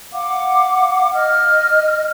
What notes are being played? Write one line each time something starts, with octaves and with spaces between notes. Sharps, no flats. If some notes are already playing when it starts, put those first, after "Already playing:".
F5 F#5 D6
D#5 F6